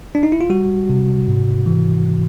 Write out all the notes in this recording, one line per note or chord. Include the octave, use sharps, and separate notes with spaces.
D4
D#4
E4
F4
G3 F#4
C3
G#2
E3